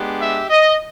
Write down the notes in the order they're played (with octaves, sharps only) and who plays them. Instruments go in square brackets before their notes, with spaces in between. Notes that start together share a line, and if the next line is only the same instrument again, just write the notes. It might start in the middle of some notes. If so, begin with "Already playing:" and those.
Already playing: [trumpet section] G#3 B3 D4 G4
E5
D#5